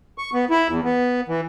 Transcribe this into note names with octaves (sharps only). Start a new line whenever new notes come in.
C#6
B3
E4
E2
B3
E3